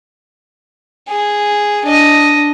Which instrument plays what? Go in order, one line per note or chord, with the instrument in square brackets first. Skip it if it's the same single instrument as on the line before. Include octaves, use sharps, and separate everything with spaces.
[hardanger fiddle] G#4
D4 D#5